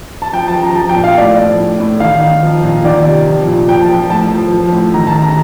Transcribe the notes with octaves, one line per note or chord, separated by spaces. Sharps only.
A5
F3 G5
A5
F3
A#5
F3 A5
G5
A#2
F5
A2 D5
F3
A2
A2
D#3 F5
D#3
F3
A#2
D#3 D5
C3
F3
A#2
F3 G5
A5
F3
A2 A5
F3
F3
A2
D#3 A#5
A5
D#3
A#5